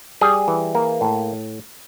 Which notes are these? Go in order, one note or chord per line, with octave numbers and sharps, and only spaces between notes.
G3 G#4
E3
A#3
A2